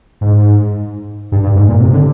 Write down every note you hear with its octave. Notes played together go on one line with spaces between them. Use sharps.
G#2
G2
G2
G#2
A#2
C3
D3